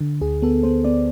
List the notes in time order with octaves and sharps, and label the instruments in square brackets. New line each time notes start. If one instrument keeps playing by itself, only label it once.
[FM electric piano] D3
D2 G#4
B3 A4
B3 C5
B3 D5